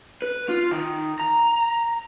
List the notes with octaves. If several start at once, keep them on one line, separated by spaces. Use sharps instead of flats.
B4
F4
D#3
A#5